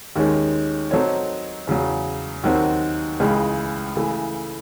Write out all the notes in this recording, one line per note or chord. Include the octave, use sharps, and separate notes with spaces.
D#2 D#3 G#3 C#4
F#3 C4 D#4 A4 C#5
E2 C#3 F#3
D#2 D#3 F#3 C4 F#4
C#2 C#3 E3 G#3
C#3 E3 A3